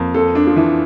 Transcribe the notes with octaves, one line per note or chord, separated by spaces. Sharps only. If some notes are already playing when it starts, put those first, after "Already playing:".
Already playing: F2 A#3
F2 A4
D4
F3
E3